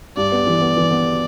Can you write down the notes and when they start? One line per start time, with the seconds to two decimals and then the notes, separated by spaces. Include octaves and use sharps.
0.17 G2 D5
0.32 B3
0.47 E3
0.61 B3
0.77 E3
0.91 B3